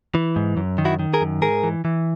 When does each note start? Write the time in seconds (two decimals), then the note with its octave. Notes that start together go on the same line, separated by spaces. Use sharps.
0.15 E3
0.36 G#2
0.57 F#2
0.78 D#3
0.85 E4 F#4
0.99 D#3
1.14 G#4 A#4
1.21 F#2
1.42 G#2 G#4 A#4
1.63 E3
1.85 E3